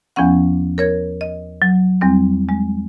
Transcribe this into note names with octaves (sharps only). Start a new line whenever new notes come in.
E2 F3 B3 C#4 F#5
A#4 C#5 G#6
D#5
F#3
E2 G3 C4
G#3